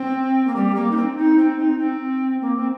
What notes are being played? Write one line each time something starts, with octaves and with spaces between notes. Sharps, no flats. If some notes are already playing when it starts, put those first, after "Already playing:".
Already playing: C4
A#3
G3
A#3
D#4
C4
D#4
C4
D#4
C4
A#3
C4